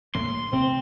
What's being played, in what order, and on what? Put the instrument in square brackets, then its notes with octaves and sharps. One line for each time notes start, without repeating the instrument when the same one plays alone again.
[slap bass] A2 A#3 [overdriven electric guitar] C6
[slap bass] C3 A3 [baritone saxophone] C4